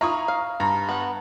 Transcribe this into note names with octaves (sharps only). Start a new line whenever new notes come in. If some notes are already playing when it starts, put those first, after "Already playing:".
E4 F4 A#5 C#6 D#6
F5
G2 A#5
B3 F#5